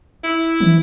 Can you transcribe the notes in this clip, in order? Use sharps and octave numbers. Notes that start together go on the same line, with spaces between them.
E4
E3